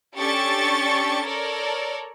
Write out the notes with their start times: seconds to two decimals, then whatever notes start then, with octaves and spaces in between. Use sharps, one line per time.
0.17 C#4 D4 G4 A4 C#6 A6
1.25 A4 A#4 C#5 D5